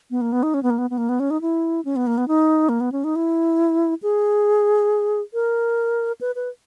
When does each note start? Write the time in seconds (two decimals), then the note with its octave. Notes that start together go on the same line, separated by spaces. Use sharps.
0.11 B3
0.21 A#3
0.32 B3
0.43 D#4
0.54 C#4
0.63 B3
0.70 A#3
0.78 B3
0.90 B3
0.98 A#3
1.09 B3
1.20 C#4
1.30 D#4
1.41 E4
1.85 C#4
1.96 B3
2.07 A#3
2.18 B3
2.28 D#4
2.69 A#3
2.81 B3
2.92 C#4
3.04 D#4
3.16 E4
4.02 G#4
5.34 A#4
6.21 B4
6.36 B4